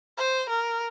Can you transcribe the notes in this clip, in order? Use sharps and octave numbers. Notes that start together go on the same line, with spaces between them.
C5
A#4